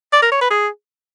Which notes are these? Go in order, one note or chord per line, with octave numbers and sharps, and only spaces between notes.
D5
A#4
C#5
B4
G#4